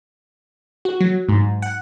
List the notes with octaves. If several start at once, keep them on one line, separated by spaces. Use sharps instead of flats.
F#4
F#3
G#2
F#5